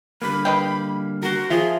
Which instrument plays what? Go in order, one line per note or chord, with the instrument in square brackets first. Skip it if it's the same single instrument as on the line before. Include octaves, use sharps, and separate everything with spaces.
[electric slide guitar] D3 G3 A#3 [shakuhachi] B5
[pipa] B4 D#5 G5 [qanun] F5
[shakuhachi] F#4 [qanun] A#4 C5
[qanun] F3 F4 [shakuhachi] G#4 [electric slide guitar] E5